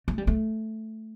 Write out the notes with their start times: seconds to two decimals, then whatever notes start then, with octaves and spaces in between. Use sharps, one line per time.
0.08 A3
0.18 G3
0.27 A3